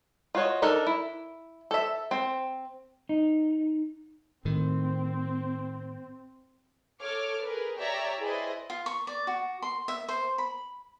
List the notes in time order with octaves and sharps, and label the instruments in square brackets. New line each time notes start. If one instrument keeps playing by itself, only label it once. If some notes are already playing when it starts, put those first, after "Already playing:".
[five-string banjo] F4 F#4 C#5 D#5
D4 D#4 A4 A#4
E4
A4 E5
C4
[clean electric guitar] D#4
[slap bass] A2 D#3 [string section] C4
[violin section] A4 C#5 D6 F6
G#4 A#4 B4
G4 C#5 D5 E5 G5 A#5
E4 G#4 B4 C5 D5 D#5
[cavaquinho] F4
C#6
D5
F#4
C6
E5
C5
B5